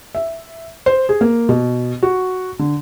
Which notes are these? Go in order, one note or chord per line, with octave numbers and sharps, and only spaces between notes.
E5
C5
G#4
A#3
B2
F#4
D3